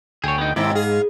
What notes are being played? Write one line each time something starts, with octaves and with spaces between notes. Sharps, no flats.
D2 G#4 C#5 G5
B3 D#4
D#2 G#2 B2 C4 E4 D6
G#4 F5